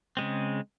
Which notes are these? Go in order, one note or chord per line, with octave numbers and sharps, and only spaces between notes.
C#3 G#3 C4